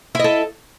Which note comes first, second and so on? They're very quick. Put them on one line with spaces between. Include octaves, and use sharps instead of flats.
E4 D#5 A4